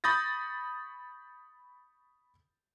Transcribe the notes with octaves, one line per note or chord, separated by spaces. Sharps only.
B5 C#6 D#6 G6 A6 A#6